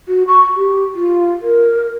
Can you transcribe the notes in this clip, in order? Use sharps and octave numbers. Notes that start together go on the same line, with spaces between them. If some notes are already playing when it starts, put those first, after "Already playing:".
F#4
C#6
G4
F4
A#4